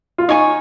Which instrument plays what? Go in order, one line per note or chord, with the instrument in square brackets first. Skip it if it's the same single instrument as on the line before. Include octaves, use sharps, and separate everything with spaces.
[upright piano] F4
[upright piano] D#4 [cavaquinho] C#5 G#5 C#6